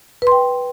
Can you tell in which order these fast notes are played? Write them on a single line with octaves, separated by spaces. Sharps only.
B4 C6 G5